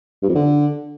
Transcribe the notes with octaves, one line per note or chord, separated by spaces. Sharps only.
G2
F2
D3